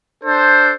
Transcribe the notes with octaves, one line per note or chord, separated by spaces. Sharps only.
D4 A4 C5